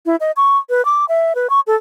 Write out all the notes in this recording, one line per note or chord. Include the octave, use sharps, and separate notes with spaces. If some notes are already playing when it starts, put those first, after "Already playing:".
E4
D#5
C#6
B4
D6
E5
B4
C#6
A4